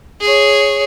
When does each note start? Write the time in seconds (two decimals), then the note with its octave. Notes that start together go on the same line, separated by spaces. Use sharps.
0.21 G#4 C#5